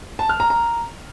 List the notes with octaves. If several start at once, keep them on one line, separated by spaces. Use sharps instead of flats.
A5
F6
A#5
A#5